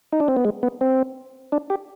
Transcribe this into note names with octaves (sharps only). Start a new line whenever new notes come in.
D#4
D4
C4
B3
G#3
B3
C4
D4
G4